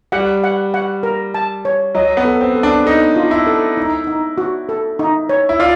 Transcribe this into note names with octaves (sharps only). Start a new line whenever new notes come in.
G3 F#5
F#5
F#5
A#4
A5
C#5
F#3 D#5
B3
A4
C4
A4
D4
D#4 A4
F4
E4
A4
D#4
D#4
F#4
A4
D#4
C#5
E4
F4 D5